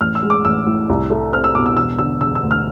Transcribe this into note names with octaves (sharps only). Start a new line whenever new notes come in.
A1 F6
E6
G#3
D6
A1 E6
A2
C2
A3
C4 F6
E6
B2 D6
E6
E1 E6
D3 E6
E1 E6
E6
D2
F6